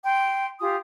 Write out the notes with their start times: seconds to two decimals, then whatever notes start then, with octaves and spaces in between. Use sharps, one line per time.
0.05 G5 C6
0.60 F4 G4 G#5 D#6